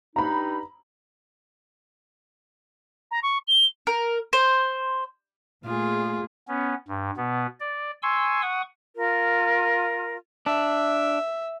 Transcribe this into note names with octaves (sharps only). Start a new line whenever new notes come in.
G2 D#4 A#5 B5
A#5
C#6
G7
A#4
C5
A#2 A3 F4 G#4
B3 C#4
G2
B2 B3
D5
G#5 C6 C#6 E6
F#5 C#6 D#6
F4 A#4
D4 E5